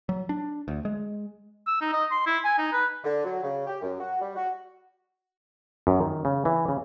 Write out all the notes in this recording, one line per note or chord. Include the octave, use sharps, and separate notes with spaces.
F#3
D4
D2
G#3
E6
D#4
D#5
C6
E4
G#5
D#4
B4
D3
F#3
C#3
G4
F#2
F#4
G3
F#4
F#2
D#3
C#3
E3
C#3